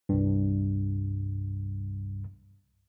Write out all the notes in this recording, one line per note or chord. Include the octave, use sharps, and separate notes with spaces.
C2 G2